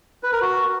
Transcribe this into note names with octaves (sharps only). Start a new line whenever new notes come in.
B4
A#4
F#4